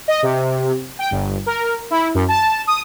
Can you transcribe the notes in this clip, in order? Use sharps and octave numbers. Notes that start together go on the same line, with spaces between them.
D#5
C3
G5
G1
A#4
E4
F#2
A5
D#6